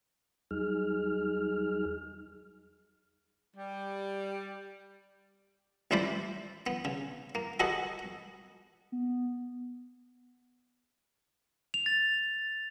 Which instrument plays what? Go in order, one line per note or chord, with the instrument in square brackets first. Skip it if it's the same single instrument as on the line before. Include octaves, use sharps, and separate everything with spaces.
[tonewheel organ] E2 F#3 G3 D#4 G#4 F6
[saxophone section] G3
[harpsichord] A1 A2 E4 C5 D5 B5
B3
C#3
A#3
F#4 G#4 A4 B4 D#5 F#5
[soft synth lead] B3
[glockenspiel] F7
A6